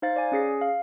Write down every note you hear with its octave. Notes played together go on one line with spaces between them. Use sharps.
D#4 C5 F5 A6
D5 G#5
C#4 G#4 C7
F5